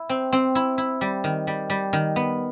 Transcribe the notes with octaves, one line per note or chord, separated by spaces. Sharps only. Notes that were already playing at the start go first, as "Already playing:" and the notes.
Already playing: E4
C4
C4
E4
E4
G3
D#3
G3
G3
D#3
B3